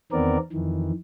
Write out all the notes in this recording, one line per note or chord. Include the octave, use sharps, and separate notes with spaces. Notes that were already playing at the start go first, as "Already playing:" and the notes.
E2 D#3 B3 C4 A#4 D5
F2 D#3 E3